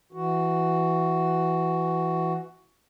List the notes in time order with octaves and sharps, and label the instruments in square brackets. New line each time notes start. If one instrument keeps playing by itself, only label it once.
[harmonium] E3 F#4